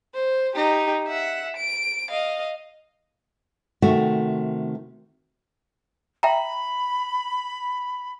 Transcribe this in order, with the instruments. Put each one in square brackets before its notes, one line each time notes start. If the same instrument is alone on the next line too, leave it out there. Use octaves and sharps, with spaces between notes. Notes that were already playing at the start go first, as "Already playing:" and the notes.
[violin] C5
D#4 G4
E5 F#5
D7
D#5 F5
[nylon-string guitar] C3 D#3 A3 F#4
[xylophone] E5 G5 A#5 [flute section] B5